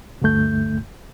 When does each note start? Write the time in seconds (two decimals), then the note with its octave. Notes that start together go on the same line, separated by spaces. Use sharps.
0.22 D2 G2 D3 A3 G6